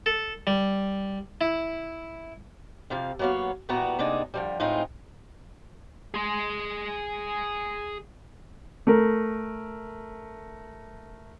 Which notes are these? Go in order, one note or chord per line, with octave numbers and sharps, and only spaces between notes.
A4
G3
E4
F2 C3 F3 F5
F#3 A#3 B3 C#5 F5
A#2 E3 G3 B3 F#4 A#5
C3 A#3 D4 D#4 G#4
D3 F3 G3
A2 G#3 C4 D#4 F4 G#5
G#4 C6
A3 A#4